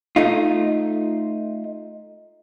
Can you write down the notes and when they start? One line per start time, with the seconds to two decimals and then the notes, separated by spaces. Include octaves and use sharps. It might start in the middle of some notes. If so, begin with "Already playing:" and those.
0.16 A3 D#4 F4